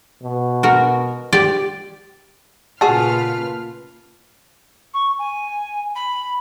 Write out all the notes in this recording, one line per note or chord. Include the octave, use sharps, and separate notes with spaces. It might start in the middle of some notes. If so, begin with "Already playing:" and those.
B2
F#4 A#4
G4 D5
A#2 C#3 F4 F#4 G#4 B4 A5 F6
C#6
G#5
B5